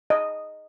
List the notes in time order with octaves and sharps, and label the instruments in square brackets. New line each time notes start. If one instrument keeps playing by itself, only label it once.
[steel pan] D#5